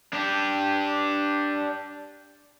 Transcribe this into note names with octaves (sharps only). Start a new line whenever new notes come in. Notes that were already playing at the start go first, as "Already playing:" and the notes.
D4 G4